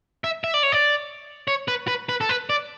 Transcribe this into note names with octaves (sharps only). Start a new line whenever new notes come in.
E5
E5
D5
C#5
D5
C#5
B4
B4
B4
A4
B4
D5